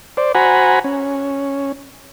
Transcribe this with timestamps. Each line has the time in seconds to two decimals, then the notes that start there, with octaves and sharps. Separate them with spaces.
0.17 C5 D5
0.35 F#4 C5 F#5 G#5 A#5 B5
0.84 C#4